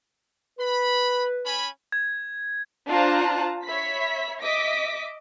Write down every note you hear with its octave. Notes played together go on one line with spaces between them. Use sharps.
B4 B5
C#4 G#5 B5
G#6
D4 F4 C5 A5 A#5 F#6
C#5 E5 B5 B6
D#5 E5 D6 B6